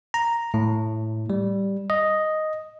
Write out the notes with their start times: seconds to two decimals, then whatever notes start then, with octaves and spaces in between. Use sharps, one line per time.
0.14 A#5
0.54 A2
1.30 G3
1.90 D#5